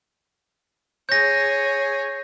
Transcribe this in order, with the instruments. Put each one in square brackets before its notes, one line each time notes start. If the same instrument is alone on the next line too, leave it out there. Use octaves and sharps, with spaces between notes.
[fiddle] G#4 C#5 [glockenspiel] G6 A#6